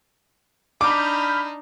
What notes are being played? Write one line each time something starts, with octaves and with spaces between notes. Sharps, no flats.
D4 D#4 B5 D6 F6 G6